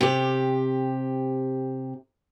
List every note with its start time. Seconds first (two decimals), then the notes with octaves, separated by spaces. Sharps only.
0.01 C3 G4